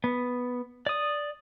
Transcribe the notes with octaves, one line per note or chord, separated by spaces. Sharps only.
B3
D5 D#6